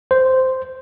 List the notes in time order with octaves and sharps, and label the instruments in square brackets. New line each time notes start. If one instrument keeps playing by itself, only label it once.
[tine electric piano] C5